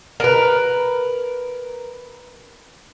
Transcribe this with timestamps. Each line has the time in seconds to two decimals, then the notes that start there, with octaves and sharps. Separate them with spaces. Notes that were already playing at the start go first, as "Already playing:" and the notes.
0.20 A#4 B4